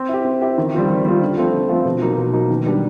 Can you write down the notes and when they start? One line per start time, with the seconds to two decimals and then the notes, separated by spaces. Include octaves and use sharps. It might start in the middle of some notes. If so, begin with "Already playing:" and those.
Already playing: C4
0.09 E4 G4
0.25 C4
0.41 E4 G4
0.58 D#3
0.74 G3 C4 F4
0.89 D#3
1.05 G3 C4 F4
1.21 D3
1.38 F3 A3 C4
1.53 D3
1.69 F3 A3 C4
1.85 B2
2.02 F#3 A#3 D#4
2.17 B2
2.33 F#3 A#3 D#4
2.50 D#3
2.65 G3 B3 D4 G4